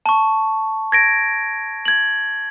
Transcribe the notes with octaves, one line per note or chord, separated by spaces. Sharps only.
A5 C#6
G#6 A#6 D7
G#6 F#7